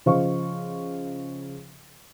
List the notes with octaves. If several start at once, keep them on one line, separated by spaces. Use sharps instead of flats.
C#3 F3 C5 D#5 F5 C#6